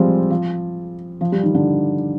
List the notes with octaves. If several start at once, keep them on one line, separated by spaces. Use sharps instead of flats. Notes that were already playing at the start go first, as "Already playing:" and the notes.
Already playing: F3 G3 G#3 C4
F3
F3
G3
D#3
D3